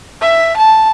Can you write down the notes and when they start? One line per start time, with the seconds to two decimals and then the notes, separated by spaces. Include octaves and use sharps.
0.21 E5
0.57 A5